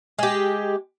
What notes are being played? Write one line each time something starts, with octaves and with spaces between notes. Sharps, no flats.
G#3 G4